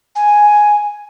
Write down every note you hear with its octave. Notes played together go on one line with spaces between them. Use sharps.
G#5